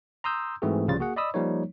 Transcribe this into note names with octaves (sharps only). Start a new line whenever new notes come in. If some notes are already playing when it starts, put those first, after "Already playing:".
A#5 C6 D#6 E6 G6
G#2 E3 A3 C4 F#4 G#4
C2 C#3 F3 G3 F4 A6
A#3 F#4 G#4 F#5
D5 D#5 B5 D#6 E6
F3 G3 A#3 D#4 C#5